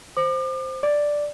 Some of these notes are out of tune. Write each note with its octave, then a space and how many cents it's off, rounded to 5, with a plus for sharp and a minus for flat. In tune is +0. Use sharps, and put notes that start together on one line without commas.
C5 +0 D6 +40
D5 +0 D6 +0